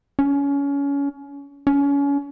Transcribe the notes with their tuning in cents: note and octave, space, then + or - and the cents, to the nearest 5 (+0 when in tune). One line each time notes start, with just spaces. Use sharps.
C#4 +25
C#4 +30